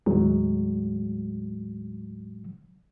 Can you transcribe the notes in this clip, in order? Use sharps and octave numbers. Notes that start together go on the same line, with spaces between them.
D#2 A2 F#3 G#3